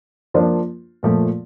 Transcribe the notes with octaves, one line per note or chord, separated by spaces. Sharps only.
F3 A#3 D4 F4 C5
A#2 F3 A3